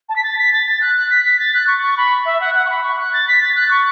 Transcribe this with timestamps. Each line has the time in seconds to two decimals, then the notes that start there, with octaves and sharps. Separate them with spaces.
0.09 A5
0.16 B6
0.23 A6
0.38 B6
0.53 A6
0.66 A6
0.81 F#6
0.95 F#6
1.10 B6
1.24 B6
1.39 A6
1.54 F#6
1.67 C#6
1.83 C#6
1.97 B5
2.25 E5
2.40 F#5
2.54 F#5
2.65 C#6
2.70 B5
2.83 C#6
2.99 F#6
3.13 A6
3.28 B6
3.41 A6
3.55 F#6
3.71 C#6